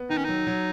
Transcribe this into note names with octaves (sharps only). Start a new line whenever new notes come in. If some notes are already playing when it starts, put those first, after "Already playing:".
Already playing: B3
D#3 D#4
C#4
F#3 D#4
F#3